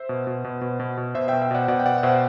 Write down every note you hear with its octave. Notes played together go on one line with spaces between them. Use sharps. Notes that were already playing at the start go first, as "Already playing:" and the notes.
Already playing: C5 E5
B2
B2
B2
B2
B2
B2
B2 C5 E5
B2 E5 G5
E5 G5
B2 D5 F#5
B2 D5 F#5
G5
B2 D5 F#5
F#5
B2 C5 E5